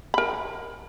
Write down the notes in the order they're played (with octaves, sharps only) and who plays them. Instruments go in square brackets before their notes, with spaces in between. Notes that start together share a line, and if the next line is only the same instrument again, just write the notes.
[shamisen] A#4 B5